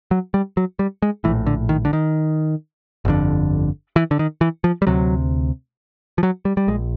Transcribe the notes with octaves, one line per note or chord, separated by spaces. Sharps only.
F#3
G3
F#3
G3
G#3
A#1 A2 E3
D3
D#3
D3
D#3
G1 F2 D3
E3
D3
D#3
E3
F3
G3
D2 C3 F#3
F3
F#3
G3
G3
A#1 G#3